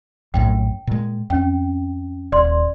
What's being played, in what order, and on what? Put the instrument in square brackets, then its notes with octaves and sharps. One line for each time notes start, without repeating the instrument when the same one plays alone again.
[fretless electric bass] A#1 F#2 A2 [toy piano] G5
[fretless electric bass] A#2 G#3
[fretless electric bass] F2 [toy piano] C#4 G5
[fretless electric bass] D#1 [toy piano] D5 C6